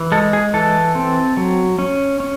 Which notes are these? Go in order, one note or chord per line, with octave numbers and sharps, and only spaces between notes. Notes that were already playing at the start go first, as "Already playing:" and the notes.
Already playing: E3
G#3 A4
G#4
E3 A4
C4
F#3
C#4
C#4